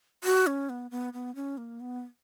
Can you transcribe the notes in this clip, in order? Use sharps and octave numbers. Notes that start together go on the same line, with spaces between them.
F#4
C#4
B3
B3
B3
C#4
A#3
B3